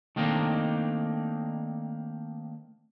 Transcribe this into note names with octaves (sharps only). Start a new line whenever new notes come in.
D#3 A3 A#3 C4 D4 D#4